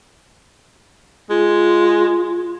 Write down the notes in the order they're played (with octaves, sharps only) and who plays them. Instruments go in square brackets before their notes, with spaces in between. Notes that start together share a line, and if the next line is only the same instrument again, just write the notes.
[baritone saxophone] G#3 [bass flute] F4